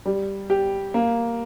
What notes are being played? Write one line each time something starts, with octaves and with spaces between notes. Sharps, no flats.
G3
G4
A#3